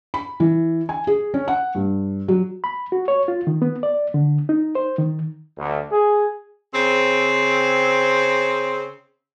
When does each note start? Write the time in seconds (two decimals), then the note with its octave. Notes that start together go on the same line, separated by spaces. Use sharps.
0.14 B5
0.40 E3
0.89 G#5
1.07 G#4
1.34 C#4
1.48 F#5
1.75 G2
2.28 F#3
2.64 B5
2.92 F#4
3.08 C#5
3.28 F4
3.47 D#3
3.62 B3
3.83 D5
4.14 D3
4.49 D#4
4.75 C5
4.98 D#3
5.58 D2
5.92 G#4
6.74 C#3 C4